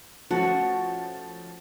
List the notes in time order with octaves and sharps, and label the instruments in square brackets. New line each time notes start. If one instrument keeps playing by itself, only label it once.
[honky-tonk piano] F3 A3 C#4 [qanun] F#4